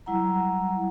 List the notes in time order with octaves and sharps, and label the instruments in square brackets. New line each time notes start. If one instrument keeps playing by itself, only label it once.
[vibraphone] F#3 G3 E4 F#5 A#5